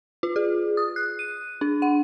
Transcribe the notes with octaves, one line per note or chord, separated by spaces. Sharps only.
F4
G#4
D#6
F#6
D#7
D4
F#5